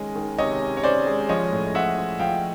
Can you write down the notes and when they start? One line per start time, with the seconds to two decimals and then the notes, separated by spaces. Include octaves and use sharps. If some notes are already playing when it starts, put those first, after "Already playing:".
Already playing: D#3 G#3 C#4 D#5
0.15 D#3
0.38 C3 C#5 D#5
0.62 C#4
0.77 C#5
0.84 C#4 C5 D5
1.07 G#3
1.29 F3 C#5 D#5
1.52 A2
1.74 F3 E5 F#5
1.98 F3
2.19 F3 F5 G5